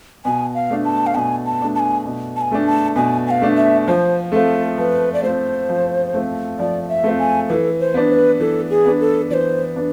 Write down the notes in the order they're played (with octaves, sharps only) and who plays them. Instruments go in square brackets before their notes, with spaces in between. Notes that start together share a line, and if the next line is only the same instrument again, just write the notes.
[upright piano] B2 [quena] G#5
[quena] F5
[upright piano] A3 D4
[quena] A5
F5
[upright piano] B2 [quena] G#5 A5
[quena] A5
[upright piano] A3 D4
[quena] A5
G#5
[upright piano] B2
[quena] A5
G#5
[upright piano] A3 D4
[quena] A5
[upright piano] B2 [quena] G#5
[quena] G#5
F5
[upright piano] A3 D4
[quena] E5
[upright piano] F3 [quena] C5
[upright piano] A3 C4 F4 [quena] A4
[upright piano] F3 [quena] B4
[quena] D5
[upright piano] A3 C4 F4 [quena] C5
[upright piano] F3
A3 C4 F4
[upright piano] F3 [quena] D5
[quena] E5
[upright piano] A3 C4 F4
[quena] G#5
[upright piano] E3 [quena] A4 B4
[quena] C5
[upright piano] B3 D4
[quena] C5
B4
[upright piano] E3 [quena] A4
[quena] G#4
[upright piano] B3 D4
[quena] A4
[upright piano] E3 [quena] C5 D5
[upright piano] B3 D4